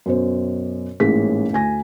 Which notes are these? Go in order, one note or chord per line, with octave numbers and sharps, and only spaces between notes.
F#2 B2 C5
A1 G#2 A#3 C#4 G#4 B6
D2 G#5 A#6